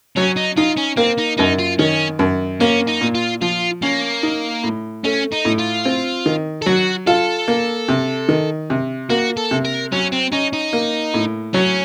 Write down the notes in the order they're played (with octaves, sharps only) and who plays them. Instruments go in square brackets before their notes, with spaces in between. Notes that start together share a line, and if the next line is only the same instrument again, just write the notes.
[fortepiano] F#3 [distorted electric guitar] C#4
[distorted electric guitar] D#4
[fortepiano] D#4 [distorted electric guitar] F4
[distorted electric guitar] C#4
[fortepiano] A#3 [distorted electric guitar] C4
[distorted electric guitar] D#4
[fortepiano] F#2 [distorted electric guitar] D#4
[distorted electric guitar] F4
[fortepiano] D#3 [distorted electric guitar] C#4
[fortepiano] F#2
[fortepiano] A#3 [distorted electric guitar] C#4
[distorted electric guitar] D#4
[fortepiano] A#2
[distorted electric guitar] F4
[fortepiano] F3 [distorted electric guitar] F4
[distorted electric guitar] A#3 [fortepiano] C#4
[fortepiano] D#4
A2
[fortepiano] A3 [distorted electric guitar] C#4
[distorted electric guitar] D#4
[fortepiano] A2
[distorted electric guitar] F4
[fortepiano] C4
D#3
[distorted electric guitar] A4
[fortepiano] F#3 [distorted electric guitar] F#4
[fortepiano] F4 [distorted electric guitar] A4
[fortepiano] A#3
C3
D#3
C3
[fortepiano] A#3 [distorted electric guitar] F#4
[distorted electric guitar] A4
[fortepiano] C3
[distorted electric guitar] A#4
[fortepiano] F#3 [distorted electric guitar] C#4
[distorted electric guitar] C4
[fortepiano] C#4 [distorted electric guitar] D#4
[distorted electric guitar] D#4
[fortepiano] A#3
A2
[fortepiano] F#3 [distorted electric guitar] C#4